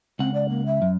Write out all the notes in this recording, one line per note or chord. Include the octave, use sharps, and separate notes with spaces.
C#2 C4 F#5
D5
A#3
E5
F#2